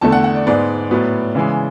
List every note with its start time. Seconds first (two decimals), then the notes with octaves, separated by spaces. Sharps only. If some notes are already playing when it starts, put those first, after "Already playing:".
0.01 E2 D3 A3 A5
0.12 F#5
0.24 F#5
0.35 D5
0.46 G#2 G#3 B3 D5
0.91 A2 F#3 B3
1.35 C#3 E3 G#3